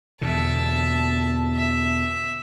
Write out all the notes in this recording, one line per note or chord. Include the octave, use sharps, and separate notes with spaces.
E2 B2 D3 E5 A5
E5